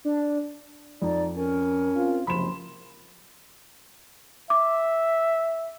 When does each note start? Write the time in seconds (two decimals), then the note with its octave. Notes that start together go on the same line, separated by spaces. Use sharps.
0.05 D4
1.02 F2 D#4 D5
1.36 C#4 A#4
1.96 C4 F4
2.27 F#1 C#2 C3 F3 B5 C6 E7
4.50 E5 D6